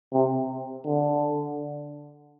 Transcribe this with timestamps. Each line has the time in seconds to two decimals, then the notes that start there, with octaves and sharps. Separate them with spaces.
0.13 C3
0.86 D3